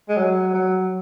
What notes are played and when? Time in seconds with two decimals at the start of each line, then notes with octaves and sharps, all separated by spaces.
0.09 G#3
0.17 F#3
0.54 F#3